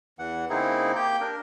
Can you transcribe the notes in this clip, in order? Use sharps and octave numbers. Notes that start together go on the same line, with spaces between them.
E2 E3 F#5
C#3 A#3 C4 D#4 E4 G#4
A#3 G4 G5 G6
D4 A#4